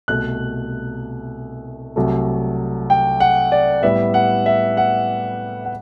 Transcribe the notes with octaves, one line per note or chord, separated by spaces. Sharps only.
C2 B2 A3 F#6
C2 C3 F#3 A3
G5
F#5
D5
A2 G3 B3 E5
F#5
E5
F#5
F#5